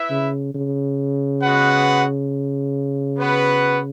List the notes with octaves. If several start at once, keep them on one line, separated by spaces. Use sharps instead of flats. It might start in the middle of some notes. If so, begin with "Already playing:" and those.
Already playing: E4 B4 E5
C#3
C#3
G#3 B3 F#4 B4 F#5
B3 F#4 B4 F#5